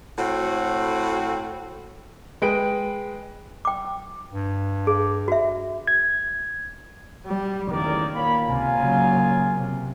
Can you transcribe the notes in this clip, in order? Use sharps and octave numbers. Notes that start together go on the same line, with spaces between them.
A2 C4 F#4
G#3 B4 G5 D7
G5 D6
G2
G#4
F#4 E5
G#6
G3
A1 E2 D#3 A#3 A#4 D5
A#2 A#3 C#5 B5
C#2 C3 F4 G#5
C#3 F#3
C3